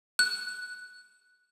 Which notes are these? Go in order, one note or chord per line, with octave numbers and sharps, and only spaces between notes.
F#6